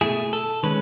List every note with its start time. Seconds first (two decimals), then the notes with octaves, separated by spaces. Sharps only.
0.01 B2 A3 E4 G#4
0.33 A4
0.63 D#3 G#3 C#4 B4